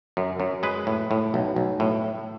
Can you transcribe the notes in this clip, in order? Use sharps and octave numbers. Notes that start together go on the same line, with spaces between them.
F#2
F#2
G#3 B4
A2
A2
B1
B1
A2